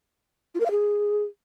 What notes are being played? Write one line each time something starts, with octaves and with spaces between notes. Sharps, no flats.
F4
A#4
F5
G#4